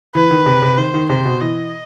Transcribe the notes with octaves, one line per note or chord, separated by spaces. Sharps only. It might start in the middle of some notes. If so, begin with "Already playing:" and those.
E3 B4
D#3
C3
C3
D#3 C5
D#3
C3 C5
B2
E3 D#5